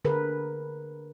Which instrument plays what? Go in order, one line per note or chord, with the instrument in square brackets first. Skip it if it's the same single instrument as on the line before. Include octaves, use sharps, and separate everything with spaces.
[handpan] D3 G#4 A#4 B4